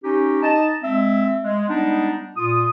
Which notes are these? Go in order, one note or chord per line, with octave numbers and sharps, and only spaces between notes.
C#4 D#4 G4
D#4 D#5 A5
G#3 C4 E5
G#3
G3 G#3 B3 D4 D#4
A#2 F4 D#6